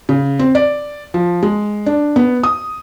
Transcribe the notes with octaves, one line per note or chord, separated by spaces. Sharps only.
C#3
C4
D5
F3
G#3
D4
B3
D#6